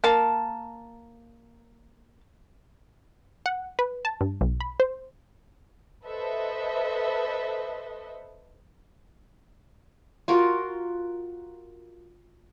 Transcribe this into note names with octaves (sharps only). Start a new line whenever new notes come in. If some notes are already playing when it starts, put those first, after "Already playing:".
A#3 A5
F#5
B4
A5
G2
B1
B5
C5
A4 B4 C5 D#5 E5
F4 F#4 A#4